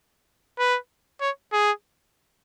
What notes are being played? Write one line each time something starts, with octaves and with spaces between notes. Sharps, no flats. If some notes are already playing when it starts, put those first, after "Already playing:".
B4
C#5
G#4